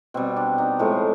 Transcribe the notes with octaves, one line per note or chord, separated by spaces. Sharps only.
B2 G3 C4
D4
D#4
A2 F3 G#3